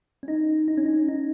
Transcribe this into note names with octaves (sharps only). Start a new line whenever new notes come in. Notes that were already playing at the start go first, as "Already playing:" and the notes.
C#4
D#4
D#4
C#4
D#4
D#4